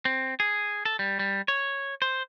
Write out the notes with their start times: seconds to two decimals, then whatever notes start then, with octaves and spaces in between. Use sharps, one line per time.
0.05 C4
0.40 G#4
0.85 A4
0.99 G3
1.19 G3
1.48 C#5
2.02 C5